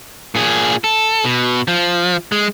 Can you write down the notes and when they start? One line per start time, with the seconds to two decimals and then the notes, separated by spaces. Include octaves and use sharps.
0.35 A#2 G#4
0.84 A4
1.25 B2
1.68 F3
2.32 G#3